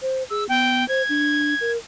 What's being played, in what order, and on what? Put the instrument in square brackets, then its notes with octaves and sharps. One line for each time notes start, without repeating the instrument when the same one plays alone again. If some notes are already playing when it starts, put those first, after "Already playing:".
[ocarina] C5
[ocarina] G#4 [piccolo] E6
[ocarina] B3 [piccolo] G5
[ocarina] C5 [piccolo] G#6
[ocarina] D4
A#4